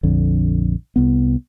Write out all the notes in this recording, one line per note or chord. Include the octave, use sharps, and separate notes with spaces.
A#1 F2 D3
C2 B3